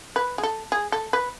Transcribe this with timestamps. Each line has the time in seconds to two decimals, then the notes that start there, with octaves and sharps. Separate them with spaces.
0.16 B4
0.38 G#4
0.43 A4
0.72 G#4
0.92 A4
1.13 B4